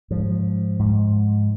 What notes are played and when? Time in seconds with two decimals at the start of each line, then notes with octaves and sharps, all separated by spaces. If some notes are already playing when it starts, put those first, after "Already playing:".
0.11 G#2 F3
0.79 G#2